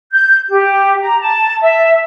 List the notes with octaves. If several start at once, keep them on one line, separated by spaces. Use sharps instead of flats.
G6
G4
A#5
A5
E5